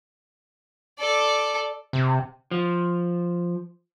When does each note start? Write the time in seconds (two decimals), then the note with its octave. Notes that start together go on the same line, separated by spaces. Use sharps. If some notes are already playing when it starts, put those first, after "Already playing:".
0.99 A4 D5
1.93 C3
2.51 F3